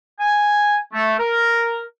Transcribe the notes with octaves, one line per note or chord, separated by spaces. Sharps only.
G#5
A3
A#4